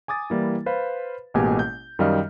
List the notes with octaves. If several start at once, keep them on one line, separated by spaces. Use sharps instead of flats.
G#5 D6 D#6 A6
E3 G3 A#3 E4
B4 C5 F5 B5
A1 B2 G#3 A#3 G4 G#5
G6
F#2 D#3 G3 D#5 F5 F6